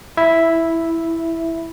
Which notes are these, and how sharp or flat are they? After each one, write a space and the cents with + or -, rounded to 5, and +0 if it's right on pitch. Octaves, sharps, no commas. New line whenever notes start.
E4 +0 E5 +0